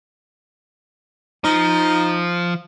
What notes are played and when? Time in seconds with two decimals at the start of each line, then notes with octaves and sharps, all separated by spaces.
1.44 F3 D#4